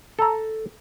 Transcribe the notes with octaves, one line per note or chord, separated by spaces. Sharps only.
A4 A#5